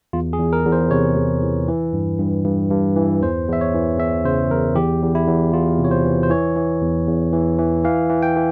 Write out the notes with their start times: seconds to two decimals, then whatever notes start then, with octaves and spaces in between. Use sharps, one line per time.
0.13 E2 F4
0.33 G#4
0.39 E2
0.53 A#4
0.65 E2
0.72 C5
0.91 C3 C#5
1.17 E2
1.42 E3
1.68 E3
1.93 G2
2.19 G2
2.46 G2
2.70 G2
2.96 E3
3.22 E2 C5
3.48 E2 E5
3.61 C#5
3.74 E3
3.99 E2 E5
4.25 C#3 C5
4.50 E2 A#4
4.76 E2 G4
5.02 E2
5.15 E4
5.27 E2
5.53 E2 F4
5.79 C3
5.84 C#5
5.91 C5
6.05 E3
6.23 C5
6.30 E3 C#5
6.57 E3
6.82 E2
7.08 E2
7.33 E3
7.59 E3
7.84 E3 F5
8.10 E3
8.22 G5
8.36 E3